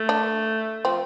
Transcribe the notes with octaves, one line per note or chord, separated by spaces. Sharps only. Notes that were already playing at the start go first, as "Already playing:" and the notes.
Already playing: A3
D4
F3 C4